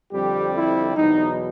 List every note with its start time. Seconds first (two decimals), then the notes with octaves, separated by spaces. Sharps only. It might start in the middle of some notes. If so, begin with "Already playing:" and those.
0.11 F2 D3 G3 C4 G4
0.54 E4
0.96 E2 B2 F#3 D#4